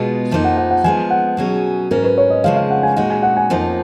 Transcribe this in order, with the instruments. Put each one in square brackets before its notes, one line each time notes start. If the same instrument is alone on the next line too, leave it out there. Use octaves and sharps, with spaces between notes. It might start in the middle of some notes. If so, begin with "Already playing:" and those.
Already playing: [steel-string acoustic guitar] B2 G#3 B3 F4
F2 F3 A#3 D#4
[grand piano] F#5
F#5
F#5
[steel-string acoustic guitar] F3 G#3 B3 [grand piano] G#5
[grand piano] F#5
[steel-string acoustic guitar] B2 F#3 C#4 G#4
[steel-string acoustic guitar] G#2 F#3 C#4 [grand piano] A#4
[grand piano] B4
C#5
D#5
[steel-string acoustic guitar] C#3 F3 G#3 [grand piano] F5
[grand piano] F5
F#5
G#5
[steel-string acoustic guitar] A#2 G#3 D#4 F#4 [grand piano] F#5
[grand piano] G#5
F#5
G#5
[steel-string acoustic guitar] F2 F3 A#3 D#4